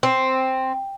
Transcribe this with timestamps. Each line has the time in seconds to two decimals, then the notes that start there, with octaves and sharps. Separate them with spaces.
0.03 C4